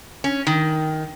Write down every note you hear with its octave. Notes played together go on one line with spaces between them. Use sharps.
C#4
D#3